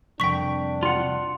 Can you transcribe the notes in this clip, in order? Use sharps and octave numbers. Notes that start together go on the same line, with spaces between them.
C2 F2 D4 G5 C#6 B6
F4 F#5